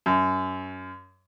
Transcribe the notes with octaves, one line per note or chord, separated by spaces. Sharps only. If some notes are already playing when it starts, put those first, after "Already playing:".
F#2